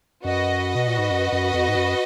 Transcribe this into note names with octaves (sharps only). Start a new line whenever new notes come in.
F#2 F#4 B4 D#5
B2
A#2
G#2
F#2
F#2
F2
G#2
F#2